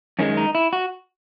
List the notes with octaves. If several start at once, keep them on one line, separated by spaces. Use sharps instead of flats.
F#2 D#3 G#3 C#4
D#4
E4
F#4